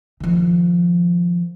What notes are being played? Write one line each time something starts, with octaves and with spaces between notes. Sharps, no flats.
D#3 F3